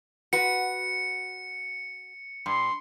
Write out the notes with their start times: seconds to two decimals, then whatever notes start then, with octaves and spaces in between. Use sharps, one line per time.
0.33 F#4 B4 C#7
2.46 G2 C6